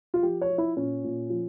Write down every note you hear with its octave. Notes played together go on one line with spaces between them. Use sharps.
F4
F3 G4
C#5
F3
E4
A#2 C#4
A#2
F3